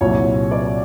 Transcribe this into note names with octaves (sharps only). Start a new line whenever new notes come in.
C2 A#2 F#3 C#5
D5